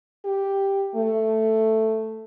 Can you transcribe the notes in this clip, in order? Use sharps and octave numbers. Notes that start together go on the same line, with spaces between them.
G4
A3